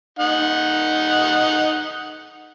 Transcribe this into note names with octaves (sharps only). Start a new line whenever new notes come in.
D#4 F#5